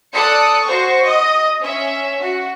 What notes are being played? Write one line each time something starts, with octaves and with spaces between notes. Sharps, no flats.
A4 D5 D#6 F#6 C#7
F#4 C5 C#6
D#5
C#4 E5
F#4